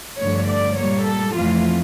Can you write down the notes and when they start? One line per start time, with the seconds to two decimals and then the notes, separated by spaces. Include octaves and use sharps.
0.19 G2 D3 F3 A3 C#5
0.48 D5
0.77 A#2 G3 A#3 C#5
1.06 A4
1.35 F2 E3 A3 F4